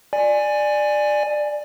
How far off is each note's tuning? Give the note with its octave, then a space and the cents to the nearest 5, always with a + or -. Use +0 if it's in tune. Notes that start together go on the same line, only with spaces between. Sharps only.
D5 +15 G#5 +0